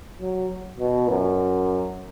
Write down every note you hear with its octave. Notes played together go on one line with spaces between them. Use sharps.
F#3
B2
F#2